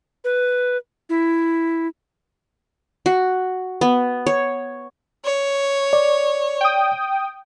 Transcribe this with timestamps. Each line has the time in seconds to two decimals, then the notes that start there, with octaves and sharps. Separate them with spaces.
0.24 B4
1.09 E4
3.06 F#4
3.81 B3
4.26 C#5
5.25 C#5
5.93 D5
6.61 G5 D#6